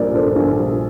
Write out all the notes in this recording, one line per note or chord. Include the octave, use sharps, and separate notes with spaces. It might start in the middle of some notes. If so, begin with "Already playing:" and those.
Already playing: A#1 A#2 G3 A#4 C5 D5
A#1 A4 C5
A#1
G3